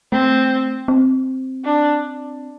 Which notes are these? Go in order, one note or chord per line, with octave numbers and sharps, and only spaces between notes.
A3 C4
C4
D4